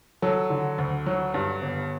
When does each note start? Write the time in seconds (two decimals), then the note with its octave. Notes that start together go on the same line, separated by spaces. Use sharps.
0.22 F#3 A4
0.50 D3
0.78 D2
1.06 F#3
1.34 G2
1.62 G1